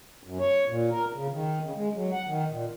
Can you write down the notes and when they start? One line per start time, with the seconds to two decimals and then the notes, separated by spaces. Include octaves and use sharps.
0.24 F#2
0.39 C#5
0.68 A#2
0.91 A#4
1.13 C#3
1.31 D#3
1.62 C#3
1.75 G#3
1.94 F#3
2.13 F#5
2.27 D#3
2.50 A#2